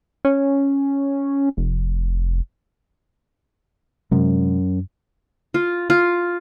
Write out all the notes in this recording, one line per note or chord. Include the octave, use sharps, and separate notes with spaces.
C#4
F1
F#2 C3 G#3
F4
F4